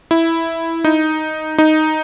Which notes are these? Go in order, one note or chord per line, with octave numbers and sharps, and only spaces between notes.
E4
D#4
D#4